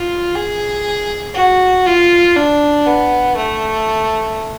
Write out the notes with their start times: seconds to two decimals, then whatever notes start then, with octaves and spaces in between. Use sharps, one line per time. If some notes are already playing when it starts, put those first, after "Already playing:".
Already playing: F4
0.35 G#4
1.35 F#4
1.86 F4
2.36 D4
2.86 B3
3.36 A3